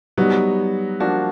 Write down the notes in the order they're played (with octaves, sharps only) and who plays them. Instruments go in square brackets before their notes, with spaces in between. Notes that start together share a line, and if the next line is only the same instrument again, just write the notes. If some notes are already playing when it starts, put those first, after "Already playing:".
[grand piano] F#3 B3 D#4 F#4 [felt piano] G3
[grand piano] F3 A#3 D4 F#4